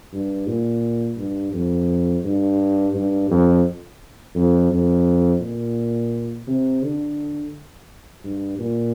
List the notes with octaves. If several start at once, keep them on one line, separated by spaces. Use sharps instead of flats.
G2
A#2
G2
F2
G2
G2
F2
F2
F2
A#2
C3
D3
G2
A#2